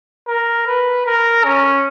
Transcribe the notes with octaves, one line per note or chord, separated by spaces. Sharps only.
A#4
B4
A#4
C#4